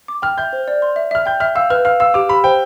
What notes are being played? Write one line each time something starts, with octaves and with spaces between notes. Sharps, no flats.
D6
G5 F6
E5 G6
C5
D5
C6
E5
E5 F6
G5 G6
E5 F6
F5 E6
B4 F6
F5 F6
F5 E6
G4 D6
G4 B5
C5 G5